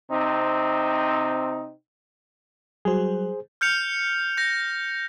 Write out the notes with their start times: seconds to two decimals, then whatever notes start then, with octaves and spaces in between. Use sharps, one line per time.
0.10 C3 C4 D#4
2.85 F#3 G3 F#4 G#4 C5
3.61 F6 G6 C#7 F7
4.37 G6 A#6